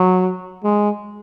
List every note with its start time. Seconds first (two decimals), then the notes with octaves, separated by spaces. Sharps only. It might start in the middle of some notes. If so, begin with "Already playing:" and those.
Already playing: F#3
0.64 G#3